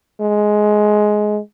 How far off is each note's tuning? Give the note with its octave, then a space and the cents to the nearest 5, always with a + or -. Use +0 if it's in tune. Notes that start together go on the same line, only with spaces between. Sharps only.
G#3 +15